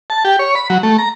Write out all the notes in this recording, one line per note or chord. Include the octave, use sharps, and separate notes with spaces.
A5
G4
C#5
B5
F#3
A3
A#5